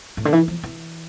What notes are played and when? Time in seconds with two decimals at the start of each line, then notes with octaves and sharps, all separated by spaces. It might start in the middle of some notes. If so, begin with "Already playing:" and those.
0.17 A2
0.25 D3
0.33 E3
0.48 F3
0.63 E3